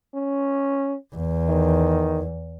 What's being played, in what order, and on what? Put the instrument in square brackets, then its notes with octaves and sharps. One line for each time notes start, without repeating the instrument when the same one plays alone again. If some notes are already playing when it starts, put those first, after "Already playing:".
[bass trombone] C#4
[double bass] E2
[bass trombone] D#3